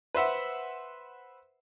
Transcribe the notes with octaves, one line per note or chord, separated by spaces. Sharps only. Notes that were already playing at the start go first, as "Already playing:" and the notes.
B4 C5 E5 F#5